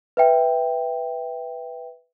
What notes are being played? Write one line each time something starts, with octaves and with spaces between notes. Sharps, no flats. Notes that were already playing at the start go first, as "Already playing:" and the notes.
B4 E5 G5